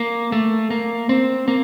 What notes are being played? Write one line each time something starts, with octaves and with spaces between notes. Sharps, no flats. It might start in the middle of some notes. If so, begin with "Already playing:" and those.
Already playing: A#3
A3
A#3
C4
A#3